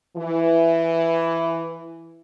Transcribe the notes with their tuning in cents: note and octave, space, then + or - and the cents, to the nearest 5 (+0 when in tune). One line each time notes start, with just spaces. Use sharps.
E3 +10